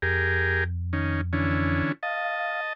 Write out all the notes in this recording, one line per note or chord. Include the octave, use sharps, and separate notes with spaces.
F2 G4 G#4 A#4
D#3 C#4
D3 E3 C#4
D#5 F5 A5